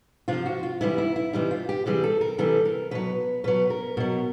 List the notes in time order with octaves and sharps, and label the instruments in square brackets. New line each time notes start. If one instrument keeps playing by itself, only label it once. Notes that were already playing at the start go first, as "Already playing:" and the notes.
[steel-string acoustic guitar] C3 F3 F4
F#4
F4
C3 E3 G3 E4
E4
E4
C3 E3 G3 D#4
F4
G4
C3 E3 G3 G#4
A4
A#4
C3 E3 G3 A4
A#4
B2 F#3 B4
B2 F#3 B4
A#4
B2 F#3